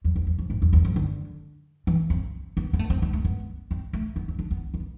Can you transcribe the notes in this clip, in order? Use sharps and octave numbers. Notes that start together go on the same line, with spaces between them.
F2
E2
F2
F2
G#2
F2
E2
F2
D3
E3
C4
B3
B3
A3
C4
A3
A3
B3
C4
A3
B3
C4
D4
B3
B3